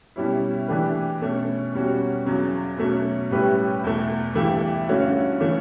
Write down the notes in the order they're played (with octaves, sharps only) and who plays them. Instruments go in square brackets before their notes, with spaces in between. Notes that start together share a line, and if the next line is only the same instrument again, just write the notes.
[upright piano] B2 G3 C#4 E4
E3 A3 D4 G4 B4
B2 A3 C#4
E2 B2 G3 C#4 F#4
E2 C#3 F#3
B2 F#3 A3 C#4
A2 G3 C#4 G4 B4
E2 B2 A3
G2 E3 A3 E4 G4
G2 D3 A3 C#4 F#4
E3 A3 C#4